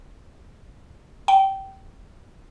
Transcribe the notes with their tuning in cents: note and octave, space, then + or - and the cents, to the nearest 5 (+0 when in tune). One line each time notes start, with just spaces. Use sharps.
G5 -20